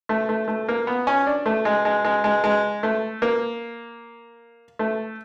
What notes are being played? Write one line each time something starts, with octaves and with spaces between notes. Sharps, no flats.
A3
A3
A3
A#3
B3
C#4
D4
A3
G#3
G#3
G#3
G#3
G#3
A3
A#3
A3